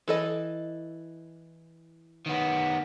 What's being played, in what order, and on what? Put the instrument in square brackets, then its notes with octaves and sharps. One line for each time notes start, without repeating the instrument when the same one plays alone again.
[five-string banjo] E3 A4 D#5
[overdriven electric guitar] D#3 B3